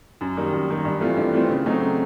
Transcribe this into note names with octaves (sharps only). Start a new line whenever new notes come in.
F#2
D#3 G3 A#3
F#2
D#3 G3 A#3
G2
E3 A3 C4 F4
G2
E3 A3 C4 F4
C#3
F#3 A3 C4 D#4
C#3